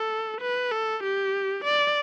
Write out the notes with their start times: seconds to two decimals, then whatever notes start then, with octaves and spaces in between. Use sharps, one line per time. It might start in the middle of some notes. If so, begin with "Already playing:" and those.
Already playing: A4
0.41 B4
0.71 A4
1.03 G4
1.64 D5